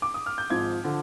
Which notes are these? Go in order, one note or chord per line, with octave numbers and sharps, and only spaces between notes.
D6
D#6
F6
G6
G#1 G#2 F3 G#6
D3 F3